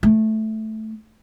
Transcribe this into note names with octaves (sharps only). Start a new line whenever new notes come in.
A3